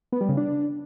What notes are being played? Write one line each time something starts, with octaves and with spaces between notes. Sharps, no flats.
B3
G3
C#3
D4